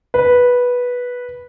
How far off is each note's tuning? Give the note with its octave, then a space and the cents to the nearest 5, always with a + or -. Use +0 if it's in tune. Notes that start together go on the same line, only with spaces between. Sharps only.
B4 -10